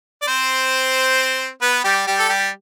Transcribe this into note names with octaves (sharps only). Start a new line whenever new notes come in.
D5
C4 C5
B3 B4
G3 G4
G3 G4
A4
G3 G4